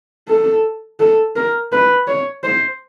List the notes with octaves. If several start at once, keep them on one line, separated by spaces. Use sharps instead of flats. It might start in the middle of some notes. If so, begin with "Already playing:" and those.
A4
A4
A#4
B4
C#5
C5